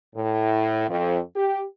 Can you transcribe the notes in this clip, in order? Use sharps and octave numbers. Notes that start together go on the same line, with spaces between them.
A2
F2
G4